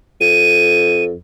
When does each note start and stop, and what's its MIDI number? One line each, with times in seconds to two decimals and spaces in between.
0.21 1.14 41
0.21 1.04 99